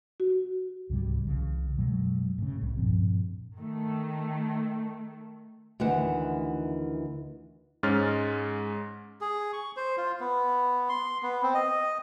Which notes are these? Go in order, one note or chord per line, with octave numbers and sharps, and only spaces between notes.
F#4
C#2 G#2 C3 G3
C2 C#3 E3
F#2 B2 F#3 G#3
A2 C#3
D1 C2 C3
G2 A#2 F3 C4
D#3 A3
D2 D#3 E3 F#5
G#2 G#3 C#4 F6 A6
G#4
C#6
C5
F4
B3
C6
B3
C4
D#5